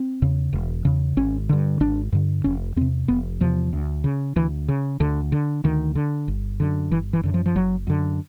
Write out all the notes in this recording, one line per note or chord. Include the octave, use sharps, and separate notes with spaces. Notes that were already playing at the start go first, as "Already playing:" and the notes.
Already playing: C4
E2 C#3
E1
E2 C#3
G#1 C#4
G2 D3
G#1 D4
G2 D3
F1 C#4
E2 C3 C4
F1 B3
E2 C3 F3
D2
C#3
D2 E3
C#3
D2 D3
D3
D2 D#3
D3
G1
F#2 D3
G1 E3
E3
F#2 D3
F3
F3
F#1 F#3
F#2 D3